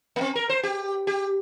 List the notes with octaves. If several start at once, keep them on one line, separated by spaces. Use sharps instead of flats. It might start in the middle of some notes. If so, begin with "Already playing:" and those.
A#3
C4
A#4
C5
G4
G4